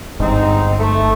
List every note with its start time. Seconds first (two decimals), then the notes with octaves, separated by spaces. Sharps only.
0.20 G1 G#2 C4 D#4
0.79 A3